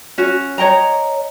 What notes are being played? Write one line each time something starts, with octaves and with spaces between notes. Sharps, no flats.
C#4 F#4
C#5 D#5 G5 A#5